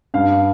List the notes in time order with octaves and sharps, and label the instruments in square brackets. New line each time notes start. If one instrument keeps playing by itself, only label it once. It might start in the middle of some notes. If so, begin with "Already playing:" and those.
[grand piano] G2 F5